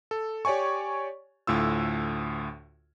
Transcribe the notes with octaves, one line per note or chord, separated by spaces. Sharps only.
A4
G4 C#5 D5 G#5 C#6
D2 A2 F4 E6